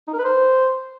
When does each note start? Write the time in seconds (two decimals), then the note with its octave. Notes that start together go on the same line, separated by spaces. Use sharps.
0.08 D#4
0.13 A#4
0.19 B4
0.24 C5